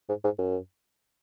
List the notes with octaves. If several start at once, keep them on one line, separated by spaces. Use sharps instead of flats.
G#2
G#2
F#2